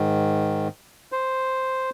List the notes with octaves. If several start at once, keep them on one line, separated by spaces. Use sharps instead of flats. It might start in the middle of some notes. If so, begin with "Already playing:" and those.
Already playing: G#2 D#3
C5